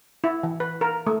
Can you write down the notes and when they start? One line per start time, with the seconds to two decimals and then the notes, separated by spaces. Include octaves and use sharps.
0.24 E4
0.43 E3
0.60 B4
0.81 A#4
1.07 A3